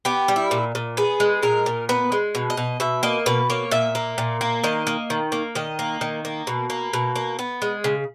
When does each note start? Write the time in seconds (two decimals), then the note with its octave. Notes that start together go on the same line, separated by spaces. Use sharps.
0.05 B3 G4
0.28 G3
0.36 E4
0.51 A#2
0.75 A#2
0.97 B3 G#4
1.20 G#3
1.43 A#2 A#4
1.66 A#2
1.89 B3 B4
2.12 G#3
2.35 B2
2.50 D#5
2.57 B2
2.80 B2 E5
3.03 A#3 D#5
3.26 B2 B4
3.50 A#3 C#5
3.71 A#2 E5
3.95 A#3
4.18 A#2
4.41 A#3
4.64 D#3 D#5
4.87 A#3
5.10 D#3
5.32 A#3
5.55 D#3 D#5
5.79 A#3
6.01 D#3
6.25 A#3
6.47 B2
6.70 A#3
6.93 B2
7.16 A#3
7.39 B3
7.62 G#3
7.84 C#3